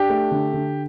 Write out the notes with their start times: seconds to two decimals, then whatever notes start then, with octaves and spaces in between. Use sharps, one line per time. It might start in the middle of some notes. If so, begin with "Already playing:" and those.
Already playing: D4 G4
0.09 A3
0.31 D3
0.54 D3